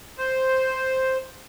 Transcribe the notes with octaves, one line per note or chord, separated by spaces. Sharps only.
C5